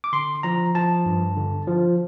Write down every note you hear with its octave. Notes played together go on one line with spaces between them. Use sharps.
D6
D3 C6
F3 A#5
F3 A5
G2
D3
F3